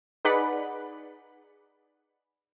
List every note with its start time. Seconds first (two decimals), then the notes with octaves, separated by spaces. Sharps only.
0.25 D#4 G#4 B4 D5 F#5 B5